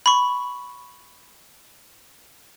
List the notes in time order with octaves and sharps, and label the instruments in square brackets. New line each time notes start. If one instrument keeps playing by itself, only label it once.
[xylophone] B5 C#6